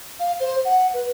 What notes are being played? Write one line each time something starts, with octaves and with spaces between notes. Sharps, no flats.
F5
C5
F#5
B4